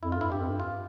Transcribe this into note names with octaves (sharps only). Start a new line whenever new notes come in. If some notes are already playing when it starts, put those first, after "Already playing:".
F2 E4
F4
G2 E4
G2 G4
F2
G2
F4